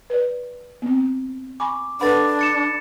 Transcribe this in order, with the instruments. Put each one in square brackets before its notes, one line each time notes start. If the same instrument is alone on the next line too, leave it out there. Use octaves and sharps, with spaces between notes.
[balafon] B4 D5
B3 C4
[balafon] G#5 B5 C#6 [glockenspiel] D6
[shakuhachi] D4 [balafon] A4 B4 F#5 [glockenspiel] B5 A6
[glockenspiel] A6 C#7 E7